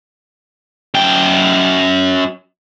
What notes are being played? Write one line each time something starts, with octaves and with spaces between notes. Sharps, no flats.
F#2 G5